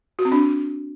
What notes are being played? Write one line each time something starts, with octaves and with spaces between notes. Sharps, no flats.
F#4
C4
D4